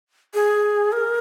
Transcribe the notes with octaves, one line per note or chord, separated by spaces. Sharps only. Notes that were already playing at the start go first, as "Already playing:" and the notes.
G#4
A#4